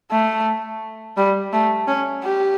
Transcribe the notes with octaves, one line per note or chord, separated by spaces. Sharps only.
A3
G3
A3
C#4
G4